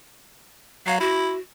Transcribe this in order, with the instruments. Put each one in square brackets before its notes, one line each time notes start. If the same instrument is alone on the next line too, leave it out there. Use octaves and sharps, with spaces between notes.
[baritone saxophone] F#3 [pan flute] F5
[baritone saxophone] E4 [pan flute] F#4